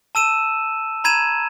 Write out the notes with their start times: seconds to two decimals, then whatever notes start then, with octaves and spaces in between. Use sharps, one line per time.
0.15 A5 E6 D#7 E7
1.04 A#5 B5 G#6 D#7 E7